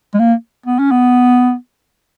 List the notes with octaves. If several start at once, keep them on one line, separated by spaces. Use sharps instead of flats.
G#3
A#3
B3
C#4
B3